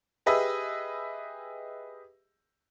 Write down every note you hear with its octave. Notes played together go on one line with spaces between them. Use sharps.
G4 G#4 B4 D#5 E5